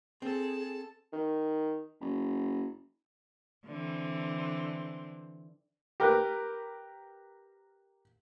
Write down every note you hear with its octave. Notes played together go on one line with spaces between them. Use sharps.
C4 G#4 A4 A5
D#3
F#1
D3 E3 C4
G4 A#4 B4